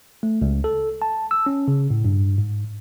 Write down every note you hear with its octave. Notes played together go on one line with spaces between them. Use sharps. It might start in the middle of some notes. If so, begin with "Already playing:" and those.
A3
C#2
A4
A5
E6
C#4
C#3
A2
G2
G#2